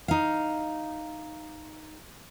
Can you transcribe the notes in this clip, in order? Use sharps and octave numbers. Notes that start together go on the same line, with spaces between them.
D#4 F5